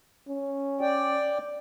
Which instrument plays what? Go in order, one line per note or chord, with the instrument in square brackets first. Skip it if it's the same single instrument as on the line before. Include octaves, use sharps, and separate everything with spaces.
[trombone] C#4
[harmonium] D5 G5